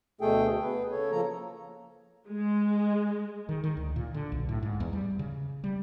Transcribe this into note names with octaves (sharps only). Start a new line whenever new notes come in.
D2 B2 A3 G#4 A4 G5
B3 G#4 B4
C#3 A4 C#5
F3 A#3 A4 A#5
G#3
D#3
D#3
D2
A#2
D3
B1
A2
G#2
E2
G3
C#3
G3